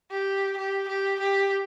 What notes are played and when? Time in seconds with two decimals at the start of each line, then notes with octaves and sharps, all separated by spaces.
0.11 G4
0.58 G4
0.88 G4
1.20 G4